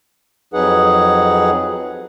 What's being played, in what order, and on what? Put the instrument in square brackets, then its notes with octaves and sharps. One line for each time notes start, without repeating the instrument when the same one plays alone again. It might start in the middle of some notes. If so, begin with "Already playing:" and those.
[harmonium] F2 F#3 D#4 G#4 B4 F#5